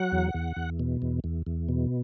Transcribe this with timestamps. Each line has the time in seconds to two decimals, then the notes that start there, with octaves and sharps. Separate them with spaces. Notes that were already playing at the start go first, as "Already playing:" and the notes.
Already playing: F#3 F#5
0.12 E2
0.34 E2
0.57 E2
0.80 B2
1.02 E2
1.24 E2
1.47 E2
1.69 B2